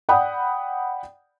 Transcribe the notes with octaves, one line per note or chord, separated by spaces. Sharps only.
D5 F#5 G5 B5 D#6